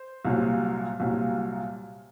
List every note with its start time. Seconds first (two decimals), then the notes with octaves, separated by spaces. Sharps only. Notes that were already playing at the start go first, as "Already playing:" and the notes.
Already playing: C5
0.25 C2 A#2 F#3
1.00 C2 A#2 F#3